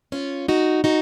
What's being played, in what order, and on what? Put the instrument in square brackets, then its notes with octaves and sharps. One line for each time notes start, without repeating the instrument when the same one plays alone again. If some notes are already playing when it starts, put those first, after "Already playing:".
[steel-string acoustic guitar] C#4 F4
D#4 F#4
D#4 F#4